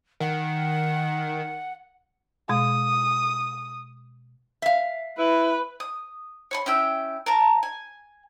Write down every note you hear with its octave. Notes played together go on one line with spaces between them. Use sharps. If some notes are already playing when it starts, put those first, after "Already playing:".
D#3 F#5
B2 G#3 D#6
E5 F5
E4 B4
D#6
C#5 B5 C6
C#4 E4 G5 E6
A#4 A5 A#5
G#5